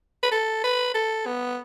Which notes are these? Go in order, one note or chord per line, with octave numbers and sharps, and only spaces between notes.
B4
A4
B4
A4
B3